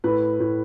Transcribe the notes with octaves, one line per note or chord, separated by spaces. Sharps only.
A2 B4
A2